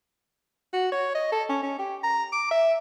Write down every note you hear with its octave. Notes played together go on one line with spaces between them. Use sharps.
F#4
C#5
D#5
A4
C#4
C#4
G4
A#5
D6
E5